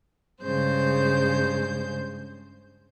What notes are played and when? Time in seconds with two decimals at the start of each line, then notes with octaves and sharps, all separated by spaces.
0.42 G2 C#3 G#3 C5 G6